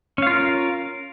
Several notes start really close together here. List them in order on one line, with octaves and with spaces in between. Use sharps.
C#4 F5 F4 A#4